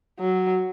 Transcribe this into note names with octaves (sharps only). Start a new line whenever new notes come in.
F#3